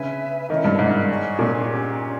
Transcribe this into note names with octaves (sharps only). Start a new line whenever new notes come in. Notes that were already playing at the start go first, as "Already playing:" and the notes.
Already playing: C#3 B4 E5 G#5
D#3 C#4 E4 A#4
G2
G#2
G#4 C#5 G#5 C#6
A#2
C#4 G4 A#4